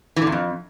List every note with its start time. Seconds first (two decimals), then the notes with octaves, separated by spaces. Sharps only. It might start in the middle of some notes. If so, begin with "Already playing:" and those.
0.16 E3
0.22 D3
0.27 E2
0.32 F2